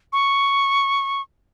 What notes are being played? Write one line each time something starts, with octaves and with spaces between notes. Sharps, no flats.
C#6